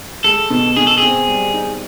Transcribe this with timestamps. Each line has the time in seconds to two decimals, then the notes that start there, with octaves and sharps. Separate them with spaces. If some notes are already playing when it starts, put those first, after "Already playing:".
0.24 G#3 A4
0.50 B2
0.76 B2 G#4
0.87 A4
0.98 C4 G#4
1.28 G3
1.53 D#4